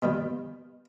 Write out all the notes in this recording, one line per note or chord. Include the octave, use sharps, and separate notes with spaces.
B2 D#3 G3